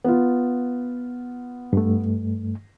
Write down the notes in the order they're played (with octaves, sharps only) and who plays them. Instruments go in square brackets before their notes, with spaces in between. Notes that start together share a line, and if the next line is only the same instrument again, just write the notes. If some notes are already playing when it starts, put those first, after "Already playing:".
[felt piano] B3 F4
[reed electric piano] G2 A3